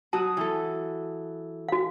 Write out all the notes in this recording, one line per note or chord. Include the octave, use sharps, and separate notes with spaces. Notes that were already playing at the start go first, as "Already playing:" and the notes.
F#3 F#4 A5 D#6
E3 A4
F#4 F5